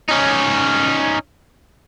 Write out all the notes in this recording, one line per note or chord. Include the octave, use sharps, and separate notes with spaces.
C#4 D#4